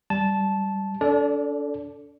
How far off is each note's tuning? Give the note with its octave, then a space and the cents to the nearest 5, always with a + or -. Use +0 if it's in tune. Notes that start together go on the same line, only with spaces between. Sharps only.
G3 -5 A5 -10
D4 -40 A4 +0 D5 +0